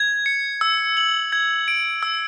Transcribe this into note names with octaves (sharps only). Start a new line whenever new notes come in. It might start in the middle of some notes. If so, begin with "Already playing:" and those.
Already playing: G#6
C#7
E6
F#7
G#6
D7
E6